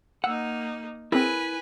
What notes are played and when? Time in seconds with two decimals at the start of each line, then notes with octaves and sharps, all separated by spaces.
0.24 A#3 D#4 F#5 E6
1.12 C4 E4 G#4 A#4 B4 G#5